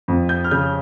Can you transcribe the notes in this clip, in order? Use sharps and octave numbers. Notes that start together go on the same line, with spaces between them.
F2
G6
F6
C#3 G6